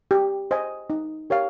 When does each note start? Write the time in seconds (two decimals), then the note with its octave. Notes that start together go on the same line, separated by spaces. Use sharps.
0.11 G4
0.51 C5 D#5 G#5
0.90 D#4
1.30 G4 A#4 C#5 F5